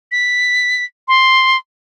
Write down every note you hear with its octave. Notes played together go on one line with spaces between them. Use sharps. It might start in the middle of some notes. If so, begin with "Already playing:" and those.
B6
C6